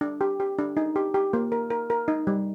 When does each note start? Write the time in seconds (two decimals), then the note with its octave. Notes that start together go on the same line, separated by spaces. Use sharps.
0.01 D4
0.21 G4
0.40 G4
0.59 D4
0.77 D#4
0.96 G4
1.14 G4
1.33 A#3
1.52 A#4
1.70 A#4
1.90 A#4
2.08 D#4
2.27 G3